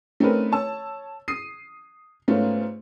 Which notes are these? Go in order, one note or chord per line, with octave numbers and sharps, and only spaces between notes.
A3 C4 C#4 D#4 A#4 B4
C#5 A5 E6
D#6 C7 D#7
G#2 A3 B3 C#4 F4